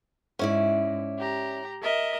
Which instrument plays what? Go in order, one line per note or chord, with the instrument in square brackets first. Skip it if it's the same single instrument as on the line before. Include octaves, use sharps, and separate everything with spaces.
[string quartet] G#2 [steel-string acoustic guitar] C#4 E4 D5
[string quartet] G4 A#5
A#4 D#5 E5